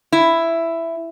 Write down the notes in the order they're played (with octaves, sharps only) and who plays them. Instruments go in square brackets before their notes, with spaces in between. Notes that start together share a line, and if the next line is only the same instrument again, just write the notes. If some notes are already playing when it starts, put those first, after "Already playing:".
[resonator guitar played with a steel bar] E4